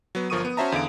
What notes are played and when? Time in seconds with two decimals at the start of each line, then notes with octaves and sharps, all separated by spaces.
0.15 F#3 B3
0.30 G1 F3 A#4 C#6 D#6 D#7
0.45 B3
0.57 C#4 F#4 C5 E5 A5 A#5
0.72 E2 D3 E4 F5 D7